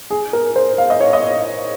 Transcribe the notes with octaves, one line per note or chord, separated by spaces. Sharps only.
G#4
A#4
C5
F5
D#5
C#5
D#5